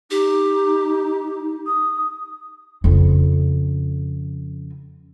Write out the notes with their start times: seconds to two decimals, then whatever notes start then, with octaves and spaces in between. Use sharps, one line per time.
0.11 D#4 G4
1.66 D#6
2.84 F2 C#3